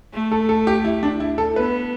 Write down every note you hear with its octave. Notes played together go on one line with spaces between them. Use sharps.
A3
A4
A4
G4
E4
D4
E4
A4
B3 B4